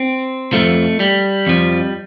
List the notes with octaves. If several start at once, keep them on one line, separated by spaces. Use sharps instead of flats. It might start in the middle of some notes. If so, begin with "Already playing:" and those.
Already playing: C4
F2 F3 A3
G3
F2 F3